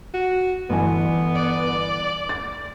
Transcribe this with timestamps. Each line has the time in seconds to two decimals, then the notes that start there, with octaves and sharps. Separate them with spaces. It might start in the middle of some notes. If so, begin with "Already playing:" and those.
0.14 F#4
0.70 G1 E3 B3 G#5
1.35 D5
2.29 A6